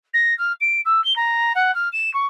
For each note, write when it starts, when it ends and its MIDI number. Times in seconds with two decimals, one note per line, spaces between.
0.13 0.36 94
0.38 0.52 89
0.60 0.80 98
0.85 1.03 88
1.04 1.15 103
1.16 1.52 82
1.55 1.73 78
1.74 1.88 89
1.92 2.13 100
2.13 2.26 85